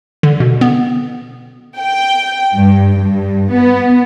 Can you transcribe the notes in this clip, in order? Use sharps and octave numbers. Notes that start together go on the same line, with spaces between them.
D3
B2
B3
G5
G2
G2
B3